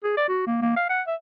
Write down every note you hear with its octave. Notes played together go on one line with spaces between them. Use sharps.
G#4
D5
F#4
A#3
A#3
F5
F#5
E5